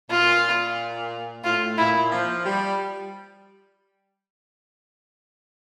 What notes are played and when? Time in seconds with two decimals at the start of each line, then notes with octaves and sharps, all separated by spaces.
0.10 A#2 F4
1.44 A2 F4
1.78 A#2 E4
2.11 F3
2.45 G3